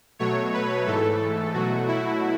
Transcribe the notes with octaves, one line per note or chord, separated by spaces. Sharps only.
B2 F#3 A3 C#5
B4
G#2 E3 A3 A4
B2 F#3 A3 F#4
E4